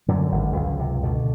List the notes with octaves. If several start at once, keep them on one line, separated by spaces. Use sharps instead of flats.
F#2 D3 F#3
G#1
C#2
C3
B2 D3